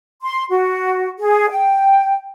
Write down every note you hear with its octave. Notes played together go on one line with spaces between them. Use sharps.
C6
F#4
G#4
G5